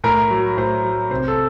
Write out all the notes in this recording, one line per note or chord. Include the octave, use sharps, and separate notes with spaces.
A2 A#4
F#3
A2 C5
F#3
C3 C5
A4